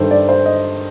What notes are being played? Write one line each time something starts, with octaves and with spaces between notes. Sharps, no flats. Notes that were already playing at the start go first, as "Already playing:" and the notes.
Already playing: G2 D#3 A4 C5
D5
C5
D#5